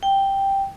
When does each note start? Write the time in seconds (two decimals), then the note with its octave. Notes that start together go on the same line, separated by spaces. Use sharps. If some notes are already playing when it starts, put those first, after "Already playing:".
0.03 G5